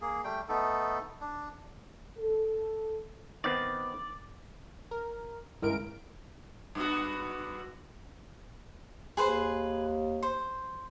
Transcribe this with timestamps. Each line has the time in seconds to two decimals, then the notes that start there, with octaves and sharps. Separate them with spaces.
0.01 A#3 G#4
0.24 G3 A3 G5
0.49 A3 B3 D#4 A4
1.21 D4
2.18 A4
3.44 D#3 B3 C4 D5
4.91 A#4
5.62 C#2 G2 D3 E4 A#4 D7
6.75 G2 B3 F#4
9.17 D#2 G#4 B4 C5
10.23 C5